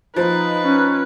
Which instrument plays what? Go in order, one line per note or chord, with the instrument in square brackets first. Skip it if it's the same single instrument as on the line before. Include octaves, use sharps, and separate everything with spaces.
[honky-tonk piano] F3 [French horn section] D#4 [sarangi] B4
[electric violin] C#4